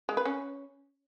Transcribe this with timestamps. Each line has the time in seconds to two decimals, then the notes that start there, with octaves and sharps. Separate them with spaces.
0.09 G#3
0.17 B4
0.25 C#4